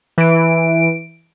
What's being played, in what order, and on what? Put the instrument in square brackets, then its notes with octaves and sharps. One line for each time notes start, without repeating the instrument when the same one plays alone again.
[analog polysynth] E3 D7